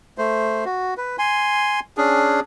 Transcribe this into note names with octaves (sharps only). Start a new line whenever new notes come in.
A3 C5
F#4
B4
G#5 C6
C#4 D4 G#4